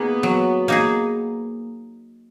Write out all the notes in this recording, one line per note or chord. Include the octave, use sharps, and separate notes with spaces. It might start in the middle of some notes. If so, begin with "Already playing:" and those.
Already playing: A#3 B3 D#4 G#4
F#3
A#3 D#4 G#4